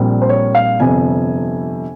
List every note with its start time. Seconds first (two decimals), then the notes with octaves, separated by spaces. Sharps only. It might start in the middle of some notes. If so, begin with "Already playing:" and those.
Already playing: A#1 A#2 G3 C4
0.22 C5
0.29 C#5
0.55 F5
0.80 G1 F2 C3 G#5